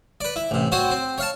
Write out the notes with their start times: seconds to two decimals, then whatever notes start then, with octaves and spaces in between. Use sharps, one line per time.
0.21 B4 D5
0.36 E4
0.51 A1 C3
0.72 C4 F#4 C5 C#5
0.91 C4
1.18 C#5 F5 A5